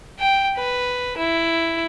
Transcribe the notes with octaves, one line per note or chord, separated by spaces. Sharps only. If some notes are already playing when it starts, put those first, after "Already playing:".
G5
B4
E4